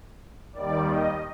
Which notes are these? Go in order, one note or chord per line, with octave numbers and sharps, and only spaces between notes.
D#2 D#3 G3 D5
D#5